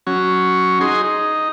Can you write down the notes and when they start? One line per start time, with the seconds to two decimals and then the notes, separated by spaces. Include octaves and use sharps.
0.07 F#3 C#4
0.81 D#4 G#4 C6
1.04 D#4